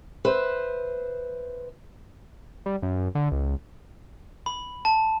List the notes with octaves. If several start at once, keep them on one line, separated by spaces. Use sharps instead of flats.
B4 C5 E5
G3
F#2
D3
C#2
B5
A5